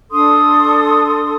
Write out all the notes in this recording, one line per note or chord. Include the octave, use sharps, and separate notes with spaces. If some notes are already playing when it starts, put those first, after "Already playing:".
D4 A4 C6 D#6